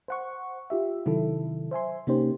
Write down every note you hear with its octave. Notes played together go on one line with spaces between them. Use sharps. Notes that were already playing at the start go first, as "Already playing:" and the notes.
C5 F#5 C#6
F4 G4 E5
C3 D#3 F#3 E4 A4
C5 E5 G#5 C6
C3 A#3 C#4 D#4 G4 C5